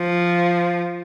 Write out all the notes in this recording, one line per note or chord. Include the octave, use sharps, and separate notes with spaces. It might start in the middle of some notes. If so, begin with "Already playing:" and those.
Already playing: F3